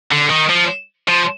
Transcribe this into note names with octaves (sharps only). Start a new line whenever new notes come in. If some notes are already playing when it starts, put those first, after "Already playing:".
D3
D#3
F3
F3